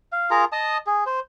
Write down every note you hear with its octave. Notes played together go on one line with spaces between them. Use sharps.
F5
F4 G#4 A#4 A#5
D#5 A5 D#6
G#4
C5